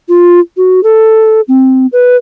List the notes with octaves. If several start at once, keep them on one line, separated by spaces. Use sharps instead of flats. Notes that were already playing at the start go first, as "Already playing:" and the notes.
F4
F#4
A4
C4
B4